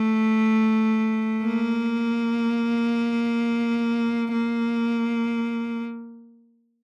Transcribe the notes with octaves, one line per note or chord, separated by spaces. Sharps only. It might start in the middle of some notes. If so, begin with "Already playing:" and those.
Already playing: A3
A#3
A#3